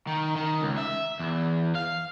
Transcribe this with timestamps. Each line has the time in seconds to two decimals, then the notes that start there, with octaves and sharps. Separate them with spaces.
0.07 D#3
0.36 D#3
0.62 C#2
0.77 E5
1.19 E2
1.76 F5